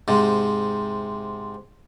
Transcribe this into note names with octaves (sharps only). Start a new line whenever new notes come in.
G#2 C3